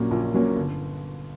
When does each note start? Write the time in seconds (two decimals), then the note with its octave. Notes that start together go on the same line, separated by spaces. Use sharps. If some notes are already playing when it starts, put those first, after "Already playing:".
Already playing: A#1 A#2 F#3 A#3 C#4
0.11 A#1
0.34 A#2 F#3 A#3 C#4
0.56 G1